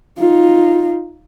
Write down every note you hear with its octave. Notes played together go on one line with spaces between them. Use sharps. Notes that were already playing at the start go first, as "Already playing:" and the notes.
D#4 F4